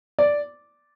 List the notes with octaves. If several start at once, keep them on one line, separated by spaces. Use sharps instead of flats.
D5